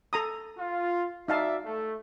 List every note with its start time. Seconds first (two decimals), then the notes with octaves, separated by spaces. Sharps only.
0.13 A4 A#5 D#6
0.58 F4
1.28 D#4 F#4 D5 E5 F5 A5
1.66 A3